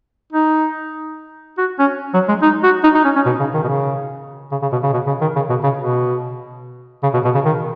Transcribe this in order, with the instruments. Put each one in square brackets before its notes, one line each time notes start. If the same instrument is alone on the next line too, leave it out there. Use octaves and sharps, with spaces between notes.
[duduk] D#4
F#4
C#4
F#3
G#3
D#4
F#4
D#4
D#4
C#4
C#4
B2
C#3
D#3
B2
C#3
C#3
C#3
B2
C#3
B2
C#3
D#3
C#3
B2
C#3
B2
C#3
B2
B2
C#3
D#3